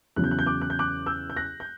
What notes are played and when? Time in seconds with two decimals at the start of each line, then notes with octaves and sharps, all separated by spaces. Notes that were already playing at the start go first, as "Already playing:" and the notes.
0.16 E2 C#3 F#3 F#6
0.24 G6
0.31 F#6
0.39 G6
0.46 D6 F#6
0.61 F#6
0.70 G6
0.79 D6 F#6
1.06 E6 G6
1.30 G6
1.37 F#6 A#6
1.60 G6